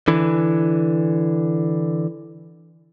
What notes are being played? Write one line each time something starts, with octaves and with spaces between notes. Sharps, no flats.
D3 E3